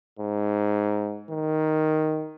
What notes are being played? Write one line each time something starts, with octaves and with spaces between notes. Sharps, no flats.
G#2
D#3